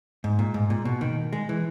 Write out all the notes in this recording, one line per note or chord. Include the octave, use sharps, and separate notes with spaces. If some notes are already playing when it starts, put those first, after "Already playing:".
G#2
A#2
G#2
A#2
B2
D#3
G#3
E3